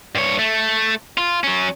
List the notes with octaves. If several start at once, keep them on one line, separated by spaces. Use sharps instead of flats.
G2 C#5
A3
F4
F#3 C#4